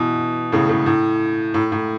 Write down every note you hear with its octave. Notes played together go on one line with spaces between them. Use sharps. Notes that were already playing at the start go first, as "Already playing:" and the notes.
Already playing: B2 E3
A2 C#3
A2 C#3
A2
A2
A2